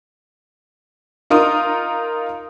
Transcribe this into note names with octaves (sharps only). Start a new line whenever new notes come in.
D#4 F4 A#4 D#6